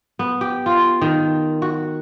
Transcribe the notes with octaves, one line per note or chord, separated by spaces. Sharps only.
B3
G4
F4
D#3
F#4